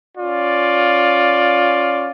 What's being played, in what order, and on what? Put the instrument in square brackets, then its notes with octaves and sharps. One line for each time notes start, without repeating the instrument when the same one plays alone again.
[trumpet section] C#4 F4 D5